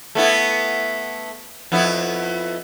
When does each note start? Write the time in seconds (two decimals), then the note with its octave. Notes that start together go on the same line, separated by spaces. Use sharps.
0.15 A3 B3 E4
1.72 F2 B3 E4